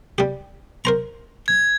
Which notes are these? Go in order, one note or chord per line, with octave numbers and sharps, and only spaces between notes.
G3 G4
A#4 C5 A#5
G#6